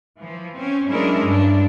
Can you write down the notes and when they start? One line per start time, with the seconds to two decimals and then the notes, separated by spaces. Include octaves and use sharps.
0.19 E3 F3
0.58 C4 C#4
0.88 F#3 G#3 C#4 D4 E4 A#4
1.21 G2 D4